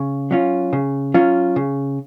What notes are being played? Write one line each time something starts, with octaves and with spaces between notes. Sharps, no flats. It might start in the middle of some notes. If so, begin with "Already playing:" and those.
Already playing: C#3
F#3 C#4 F4
C#3
F#3 C#4 F4
C#3